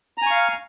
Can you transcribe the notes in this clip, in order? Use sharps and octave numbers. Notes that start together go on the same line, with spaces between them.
F5 G#5 A#5 C#6